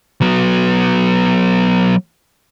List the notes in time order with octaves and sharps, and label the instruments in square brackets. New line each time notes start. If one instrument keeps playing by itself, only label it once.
[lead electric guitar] F#3 B3